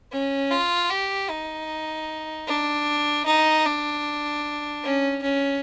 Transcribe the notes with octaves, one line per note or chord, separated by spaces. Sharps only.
C#4
F4
G4
D#4
D4
D#4
D4
C#4
C#4